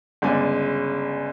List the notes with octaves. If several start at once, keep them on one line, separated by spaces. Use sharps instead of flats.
G1 C#3 G#3 D5 G#5